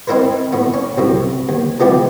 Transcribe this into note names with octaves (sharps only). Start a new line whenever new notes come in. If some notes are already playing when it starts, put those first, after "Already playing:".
C4 D#4 E4 A#4 B4
A2 B3
C#4
C2 F#2 A2
D#2
C3 E3 F3 G#3 B3 G4